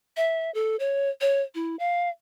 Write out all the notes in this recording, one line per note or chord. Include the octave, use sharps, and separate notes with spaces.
E5
A4
C#5
C#5
E4
F5